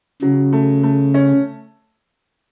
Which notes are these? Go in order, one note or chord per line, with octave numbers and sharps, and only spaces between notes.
C#3 F#3
A3
A3
C#4